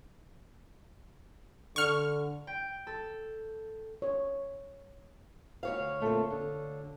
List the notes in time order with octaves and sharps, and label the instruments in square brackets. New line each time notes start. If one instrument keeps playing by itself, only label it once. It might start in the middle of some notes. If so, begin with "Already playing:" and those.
[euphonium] D3 [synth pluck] C#6 F6
[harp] G5
A4
[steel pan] C#5
[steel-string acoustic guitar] D2 C#5 F5
[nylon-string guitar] A#2 A3 C4
D3